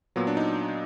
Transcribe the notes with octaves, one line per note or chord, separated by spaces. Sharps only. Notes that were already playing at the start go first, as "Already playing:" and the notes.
A#2 F#3 B3
D4
D#4